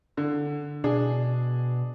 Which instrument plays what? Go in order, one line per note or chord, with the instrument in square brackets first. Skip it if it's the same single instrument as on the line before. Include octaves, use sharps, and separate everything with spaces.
[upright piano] D3
[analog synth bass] B2 [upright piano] D4 G#4